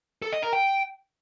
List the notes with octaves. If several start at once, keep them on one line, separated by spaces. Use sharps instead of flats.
A4
D#5
A#4
G5